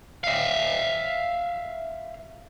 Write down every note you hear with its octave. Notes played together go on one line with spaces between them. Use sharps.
E5 F5